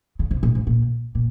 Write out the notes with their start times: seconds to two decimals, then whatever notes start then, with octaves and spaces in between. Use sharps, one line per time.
0.19 C#3
0.31 C3
0.43 A#2
0.55 G#2
0.67 A#2
1.15 A#2